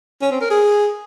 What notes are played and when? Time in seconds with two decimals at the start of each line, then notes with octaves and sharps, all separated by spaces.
0.22 C#4
0.31 C4
0.41 A#4
0.50 G#4